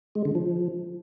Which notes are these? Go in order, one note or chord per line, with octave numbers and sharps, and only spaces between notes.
G#3
D3
F3